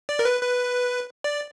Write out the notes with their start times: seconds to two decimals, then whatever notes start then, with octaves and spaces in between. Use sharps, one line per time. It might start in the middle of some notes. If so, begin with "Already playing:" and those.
0.09 D5
0.19 A#4
0.25 B4
0.42 B4
1.24 D5